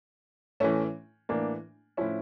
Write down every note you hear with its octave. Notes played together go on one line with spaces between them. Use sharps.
A2 E3 A3 C#4
A2 E3 A#3 D4
A2 F3 C#4 E4